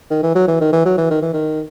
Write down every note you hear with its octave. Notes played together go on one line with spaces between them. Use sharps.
D#3
E3
F#3
E3
D#3
E3
F#3
E3
D#3
E3
D#3